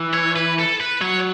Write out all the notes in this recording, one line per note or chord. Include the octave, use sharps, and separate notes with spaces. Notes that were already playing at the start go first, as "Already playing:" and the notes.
Already playing: E3
C#5
B4
A4
B4
F#3 C#5